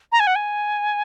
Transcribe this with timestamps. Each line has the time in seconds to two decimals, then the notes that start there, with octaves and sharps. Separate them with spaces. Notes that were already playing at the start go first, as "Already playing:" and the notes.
0.12 A#5
0.20 G#5
0.27 F#5
0.36 G#5